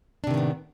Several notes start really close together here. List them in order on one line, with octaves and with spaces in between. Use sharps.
D4 C3 D#3 A2 B3